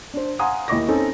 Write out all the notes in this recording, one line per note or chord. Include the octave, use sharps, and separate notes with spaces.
D4 C5
F5 F#5 G#5 A#5 C6 D#6
D#2 E4 D#5 C#6 D6 A#6
C4 C#4 D#4 A4